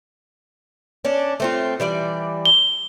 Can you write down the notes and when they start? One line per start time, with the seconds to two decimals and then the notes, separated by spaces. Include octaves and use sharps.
1.05 C#4 D4
1.40 A3 C4 F4
1.80 E3 G3 D5
2.45 G7